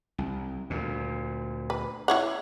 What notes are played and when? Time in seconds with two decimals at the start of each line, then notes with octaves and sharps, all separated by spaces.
0.18 C2
0.70 D2 A#2
1.70 B4
2.08 E4 C#5 F#5